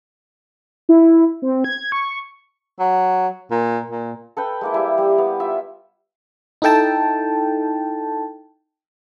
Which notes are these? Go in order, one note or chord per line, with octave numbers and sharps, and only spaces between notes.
E4
C4
G#6
C#6
F#3
A#2
A#2
A4 B4 G5 B5
G#3 A#3 E4
G3 E4 E5
G3
B3
F4 E5
D#4 E4 A4 G5 A5